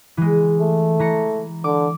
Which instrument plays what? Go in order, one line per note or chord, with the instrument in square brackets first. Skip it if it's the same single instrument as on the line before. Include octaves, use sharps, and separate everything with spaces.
[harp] E3 G#3
[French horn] A3
[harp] E3 A#5 C#7
[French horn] D3 [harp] D6